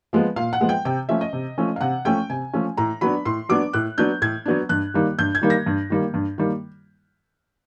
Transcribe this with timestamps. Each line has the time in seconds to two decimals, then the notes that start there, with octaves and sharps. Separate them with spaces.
0.13 F3 G#3 B3
0.36 A#2 F5
0.53 F#5
0.61 F3 G#3 B3
0.69 G5
0.85 C3 G5
1.09 F3 A3 C#4 E5
1.21 D#5
1.33 C3
1.58 F3 A3 C#4
1.76 F5
1.81 C3 F#5
2.05 F3 A3 C#4 G5
2.30 C3 G#5
2.53 F3 A3 C#4
2.77 A2 A#5
3.01 F#3 B3 D4 B5
3.25 A2 C6
3.49 F#3 B3 D4 D6
3.73 A2 F#6
3.98 F#3 B3 D4 G6
4.22 A2 G#6
4.46 F#3 B3 D4
4.69 G2 F#6
4.94 D#3 G3 A#3
5.19 G2 G6
5.35 G#6
5.42 D#3 G3 A#3
5.50 A#6
5.66 G2
5.90 D#3 G3 A#3
6.14 G2
6.38 D#3 G3 A#3